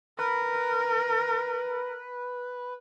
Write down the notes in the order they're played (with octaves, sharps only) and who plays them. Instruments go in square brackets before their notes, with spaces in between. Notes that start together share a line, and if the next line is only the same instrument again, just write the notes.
[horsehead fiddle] A#4 [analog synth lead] B4